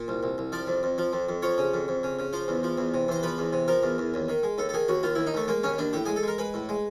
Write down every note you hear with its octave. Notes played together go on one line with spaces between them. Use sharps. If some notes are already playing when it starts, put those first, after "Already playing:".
Already playing: A#2
C2
C2
C2
F3 D5
F2
F2
F3
F2
F2
F3 C#5
C#3
F2
F2
C#3
C#3
F3 C5
E2
F3
E2
C3
E2 C5
F3 B4
E2
C3
F3 A#4
E2
E2
D#2
D#3
G#3
D#2 A4
A4
D#3 G#4
D#2 F#4
D#2 F4
D#2 E4
D#4
D#2 A3
G#3 A#3
D#2 C#4
D#2 D4
A2 G4
G#3 G#4
A4
G#3 A#4
G#3 B4
A2
G#3